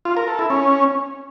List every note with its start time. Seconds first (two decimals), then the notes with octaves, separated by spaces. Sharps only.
0.05 F4
0.17 A#4
0.28 A4
0.39 E4
0.50 C#4